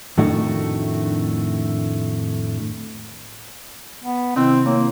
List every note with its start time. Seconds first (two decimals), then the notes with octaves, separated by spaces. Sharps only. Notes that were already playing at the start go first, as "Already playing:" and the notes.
0.18 F2 A2 D#3 A3 D4 F#4
4.04 B3
4.36 C3 D#3 C4 E4
4.66 A#3 E4 C#5